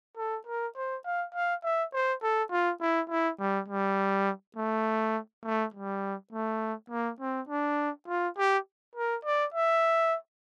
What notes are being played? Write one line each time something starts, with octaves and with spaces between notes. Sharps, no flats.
A4
A#4
C5
F5
F5
E5
C5
A4
F4
E4
E4
G3
G3
A3
A3
G3
A3
A#3
C4
D4
F4
G4
A#4
D5
E5